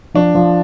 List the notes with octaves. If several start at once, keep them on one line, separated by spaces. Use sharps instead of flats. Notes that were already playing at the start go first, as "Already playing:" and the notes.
F3 D4
F3